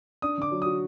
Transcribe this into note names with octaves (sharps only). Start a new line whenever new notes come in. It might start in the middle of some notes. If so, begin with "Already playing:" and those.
D4 D#6
D3 D6
F#3
F#4 D#6